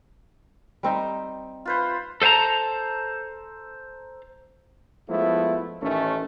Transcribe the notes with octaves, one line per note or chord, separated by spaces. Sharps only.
G3 C4 D#4
F4 B4 C5
A4 C5 F5 A5 A#5
F3 G#3 A3 B3 E4
A1 D#3 A3 C#4